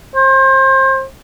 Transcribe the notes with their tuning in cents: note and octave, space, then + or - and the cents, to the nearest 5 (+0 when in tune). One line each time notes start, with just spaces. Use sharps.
C5 +30